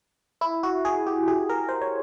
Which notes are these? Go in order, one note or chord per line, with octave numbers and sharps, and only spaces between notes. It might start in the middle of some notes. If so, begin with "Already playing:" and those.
E4
F#4
G#4
G4
G#4
A#4
C5
C#5